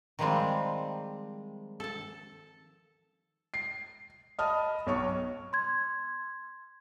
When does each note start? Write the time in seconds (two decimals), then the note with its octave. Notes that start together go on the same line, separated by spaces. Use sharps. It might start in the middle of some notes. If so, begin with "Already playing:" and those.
0.19 D#3 F3 G3 G#3 C4
1.80 A4 A5
3.54 C7
4.39 D#5 A5 B5 D#6 F6
4.87 B1 C#5 C#6
5.53 C6 G#6